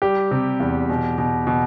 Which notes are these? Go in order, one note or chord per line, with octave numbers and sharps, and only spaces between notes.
G3 G4
C3
E2
B2
B2
B2